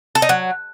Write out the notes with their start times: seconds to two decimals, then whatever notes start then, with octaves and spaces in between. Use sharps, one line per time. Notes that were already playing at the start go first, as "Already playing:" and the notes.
0.15 A4
0.22 D#4
0.29 F#3